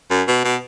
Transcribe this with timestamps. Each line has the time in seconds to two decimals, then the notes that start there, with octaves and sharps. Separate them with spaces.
0.11 F#2
0.28 B2
0.44 B2